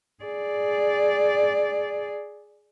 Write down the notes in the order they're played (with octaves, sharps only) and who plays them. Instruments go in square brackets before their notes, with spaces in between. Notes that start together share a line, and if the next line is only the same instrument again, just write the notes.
[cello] G#4 D5